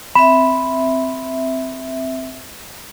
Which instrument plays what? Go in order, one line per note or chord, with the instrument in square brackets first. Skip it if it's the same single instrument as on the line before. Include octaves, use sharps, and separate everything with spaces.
[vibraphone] C4 E5 [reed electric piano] B5